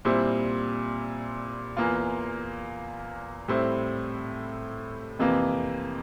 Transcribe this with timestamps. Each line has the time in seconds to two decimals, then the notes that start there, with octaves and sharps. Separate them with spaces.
0.05 A#2 G3 C4 E4
1.77 E2 E3 A#3 F4
3.48 A2 G3 C4 E4
5.19 F2 C3 E3 A#3